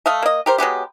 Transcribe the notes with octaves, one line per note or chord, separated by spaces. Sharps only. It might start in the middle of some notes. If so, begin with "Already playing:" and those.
A3 D#5 F5
A#3 D#5
G4 A#4 C5
F#3 G#3 B3 G4